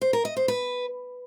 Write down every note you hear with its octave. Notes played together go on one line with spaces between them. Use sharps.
C5
A#4
D#5
C5
B4